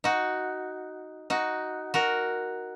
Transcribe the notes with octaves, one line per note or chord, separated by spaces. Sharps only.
D#4 F#4
D#4 F#4
F#4 A#4